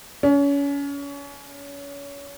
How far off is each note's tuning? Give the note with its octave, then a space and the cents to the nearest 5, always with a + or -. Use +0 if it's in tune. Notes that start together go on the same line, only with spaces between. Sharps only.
C#4 +30